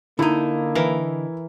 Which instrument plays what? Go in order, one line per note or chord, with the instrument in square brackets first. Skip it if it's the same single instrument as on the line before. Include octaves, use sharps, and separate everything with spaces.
[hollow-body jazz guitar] D3 D#4 [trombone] A#3 [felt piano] E4
[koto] E3 A#4